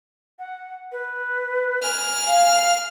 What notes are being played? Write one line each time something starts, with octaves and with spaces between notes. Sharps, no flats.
F#5
B4
G#5 F6
F5